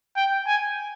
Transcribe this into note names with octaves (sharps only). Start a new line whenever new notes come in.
G5
G#5